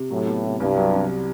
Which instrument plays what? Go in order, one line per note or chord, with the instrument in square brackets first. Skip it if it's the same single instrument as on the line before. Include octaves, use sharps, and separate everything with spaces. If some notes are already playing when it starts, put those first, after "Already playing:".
Already playing: [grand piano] C3
[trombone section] A2 [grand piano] F#3
[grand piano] B3
C3
[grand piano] C2 [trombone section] G2
[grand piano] F#3
C3